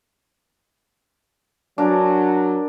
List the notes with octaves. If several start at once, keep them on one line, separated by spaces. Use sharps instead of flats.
F#3 D4 A#4 G#5